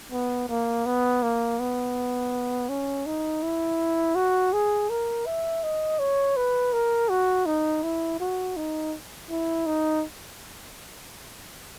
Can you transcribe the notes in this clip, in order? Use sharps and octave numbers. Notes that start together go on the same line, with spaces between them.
B3
A#3
B3
A#3
B3
C#4
D#4
E4
F#4
G#4
A#4
E5
D#5
C#5
B4
A#4
F#4
D#4
E4
F#4
D#4
E4
D#4